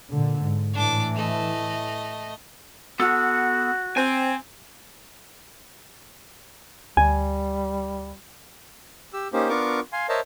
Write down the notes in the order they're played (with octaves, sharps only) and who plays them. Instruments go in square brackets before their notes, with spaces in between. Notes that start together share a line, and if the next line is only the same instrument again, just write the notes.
[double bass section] A#2 D3
G#2
[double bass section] A2 E3 [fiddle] D4 D6
[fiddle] A3 D#5
[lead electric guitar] B3 A4 [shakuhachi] F#4
[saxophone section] C4 [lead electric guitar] G#5
[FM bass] D2 [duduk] G3 [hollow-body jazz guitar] G#5
[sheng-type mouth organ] G4 E6
A#3 C#4 D#4 G4 C5
B3 D4 F4 A#4 C#6 D6
F5 G#5 C6
A#4 C5 C#5 D#5 E5 A5